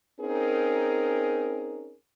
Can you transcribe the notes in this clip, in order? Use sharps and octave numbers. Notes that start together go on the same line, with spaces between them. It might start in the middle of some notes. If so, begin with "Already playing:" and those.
C4 C#4 D#4 G#4 A#4